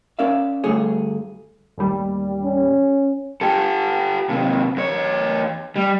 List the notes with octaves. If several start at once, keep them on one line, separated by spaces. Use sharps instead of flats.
C#4 A#4 D5 E5 F5
D2 G2 A3 G#4 C#5
A1 D#2 G3
C#4
G4 A4
D#2 C3
E2 C#5
G3